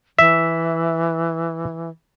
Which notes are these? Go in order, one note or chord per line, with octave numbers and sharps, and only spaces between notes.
E3 E5